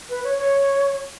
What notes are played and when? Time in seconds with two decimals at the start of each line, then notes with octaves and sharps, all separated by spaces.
0.09 B4
0.24 C#5
0.38 C#5